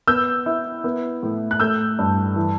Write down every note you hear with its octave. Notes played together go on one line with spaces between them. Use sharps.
B3 E6 G6
E4
B3
A2
F#6
A3 E6 G6
G2
E3